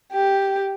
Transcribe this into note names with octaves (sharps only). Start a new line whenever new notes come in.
G4